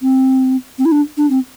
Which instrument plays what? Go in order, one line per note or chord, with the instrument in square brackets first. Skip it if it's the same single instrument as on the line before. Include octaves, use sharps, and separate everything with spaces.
[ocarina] C4
C4
E4
D4
D4
C4